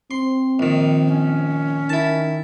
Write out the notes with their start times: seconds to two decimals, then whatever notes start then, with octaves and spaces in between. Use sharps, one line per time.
0.11 C4 C6
0.59 A#1 D#3
1.08 C#4
1.89 D#3 E4 A5